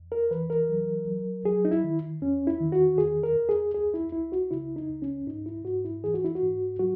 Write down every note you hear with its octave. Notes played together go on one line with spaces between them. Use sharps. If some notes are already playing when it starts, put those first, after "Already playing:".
Already playing: E2
A#4
E3 B4
A#4
F#3
F#3
F#3 G#4
D#4
E4
D#3
E2 C#4
E4
D#3
F#4
E2 G#4
A#4
E2
G#4
C#2 G#4
E4
C#2 E4
F#4
C#3 E4
D#4
C#2
C#4
G#2 D#4
E4
G#2 F#4
E4
E3 G#4
F#4
E4
F#4
G#2
F#3 F#4